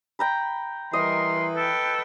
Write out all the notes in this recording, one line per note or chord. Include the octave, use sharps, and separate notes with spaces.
G5 A#5 B5
E3 G3 A#4 D#5 C6
A4 B4 G5